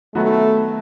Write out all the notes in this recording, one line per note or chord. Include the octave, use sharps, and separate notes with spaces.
D#3 F#3 A3 B3 F#4